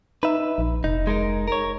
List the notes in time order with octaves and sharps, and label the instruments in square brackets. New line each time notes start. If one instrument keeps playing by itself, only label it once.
[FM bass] D#4 [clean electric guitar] B4 E5
[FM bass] A#1
[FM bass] F1 [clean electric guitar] D#4
[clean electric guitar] G#3 D#4 A#4
A#4 C#5